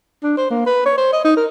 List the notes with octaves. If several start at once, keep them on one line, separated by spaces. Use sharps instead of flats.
D4
C5
A#3
B4
C#5
C5
D#5
D#4
A#4